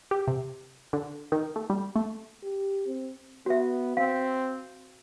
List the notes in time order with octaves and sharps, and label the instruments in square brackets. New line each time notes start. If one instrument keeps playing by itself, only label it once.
[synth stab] G4
C3
D3
D#3
A3
G3
A3
[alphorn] G4
C4
[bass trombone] B3 [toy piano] F#4 E5
[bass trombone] C4 [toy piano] F5